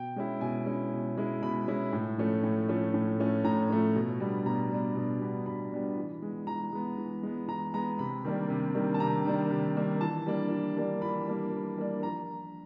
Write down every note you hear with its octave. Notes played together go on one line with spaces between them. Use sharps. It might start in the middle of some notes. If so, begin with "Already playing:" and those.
Already playing: B2 G5
G#3 C#4 E4
B2 G#5
G#3 C#4 E4
B2
G#3 C#4 E4
B2 B5
G#3 C#4 E4
A2
F3 A3 C#4
A2
F3 A3 C#4
A2
F3 A3 C#4
A2 A#5
F3 A3 C#4
B2
G3 B3 D4
B2 A#5
G3 B3 D4
B2
G3 B3 D4
B2 B5
G3 B3 D4
E3
G#3 B3
E3 A#5
G#3 B3
E3
G#3 B3
E3 A#5
G#3 B3 A#5
C3 B5
D#3 G3 A#3 D4
C3
D#3 G3 A#3 D4
A5
C3 A#5
D#3 G3 A#3 D4
C3
D#3 G3 A#3 D4
E3 A5
G3 A#3 D4
E3
G3 A#3 D4
E3 B5
G3 A#3 D4
E3
G3 A#3 D4
F3 A#5